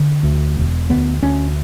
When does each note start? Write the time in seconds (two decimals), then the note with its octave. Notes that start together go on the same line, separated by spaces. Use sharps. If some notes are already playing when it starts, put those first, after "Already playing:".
Already playing: D3
0.23 D2
0.57 E1
0.90 D2 B3
1.23 D2 C#4